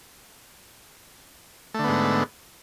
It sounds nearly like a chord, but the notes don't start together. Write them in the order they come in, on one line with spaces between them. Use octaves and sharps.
A3 D3 B3 G#2